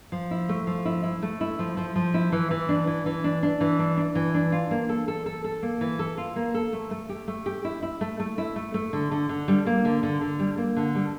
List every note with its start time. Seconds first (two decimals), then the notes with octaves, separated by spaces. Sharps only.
0.12 F3
0.31 E4
0.49 A3
0.67 F3
0.85 E4
1.04 E4
1.22 A3
1.41 E4
1.59 F3
1.77 F3
1.96 F3
2.14 E4
2.32 E3
2.51 E3
2.69 D4
2.87 E3
3.06 E3
3.24 D4
3.43 D4
3.61 E3
3.79 D4
3.97 D4
4.15 E3
4.34 D4
4.52 F4
4.71 A#3
4.89 A4
5.08 A4
5.26 A4
5.44 A4
5.63 A#3
5.81 E3
5.99 A4
6.18 F4
6.36 A#3
6.54 A4
6.73 A3
6.91 A3
7.09 G4
7.28 A3
7.46 G4
7.64 E4
7.82 E4
8.01 A3
8.20 A3
8.38 E4
8.56 A3
8.74 A3
8.93 D3
9.11 D3
9.29 D3
9.48 G3
9.67 A#3
9.85 D3
10.03 D3
10.21 D3
10.39 G3
10.58 A#3
10.77 D3
10.95 G3